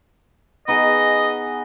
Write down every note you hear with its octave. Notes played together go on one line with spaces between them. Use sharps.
B3 D#4 G#4 D#5